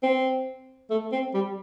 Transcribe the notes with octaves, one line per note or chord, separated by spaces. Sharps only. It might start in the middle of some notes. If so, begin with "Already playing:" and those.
C4
A3
C4
G3